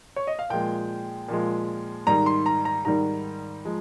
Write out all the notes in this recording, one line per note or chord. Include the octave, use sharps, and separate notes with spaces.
C#5
D#5
F5
A#2 F3 G#3 G5
A#2 F3 G#3
G#2 D#3 G3 A#5
C6
A#5
A#5
G#2 D#3 G3 A#5
F3 G#3